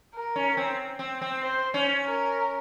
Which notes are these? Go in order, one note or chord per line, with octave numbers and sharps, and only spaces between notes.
A#4
C#4
C4
C4
C4
C5
C#4
A#4